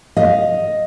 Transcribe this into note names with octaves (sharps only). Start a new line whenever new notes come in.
D#5 F5